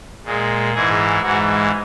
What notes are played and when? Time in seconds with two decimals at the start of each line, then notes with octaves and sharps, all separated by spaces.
0.25 A#2 G#3
0.73 G#2 E3 G#3 G#4
1.22 G#2 E3 G#3 F#4